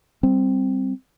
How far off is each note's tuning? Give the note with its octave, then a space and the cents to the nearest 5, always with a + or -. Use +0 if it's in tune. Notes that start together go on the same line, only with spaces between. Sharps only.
G3 +0 C4 +0